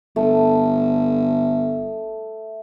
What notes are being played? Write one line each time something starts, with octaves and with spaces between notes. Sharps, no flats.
G1 A3